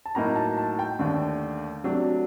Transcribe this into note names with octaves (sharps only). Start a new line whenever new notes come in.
A5
A2 F#3 A#3 D#4 A#5
A5
A5
G5
D#2 D3 A3 D4
C3 F#3 A3 D4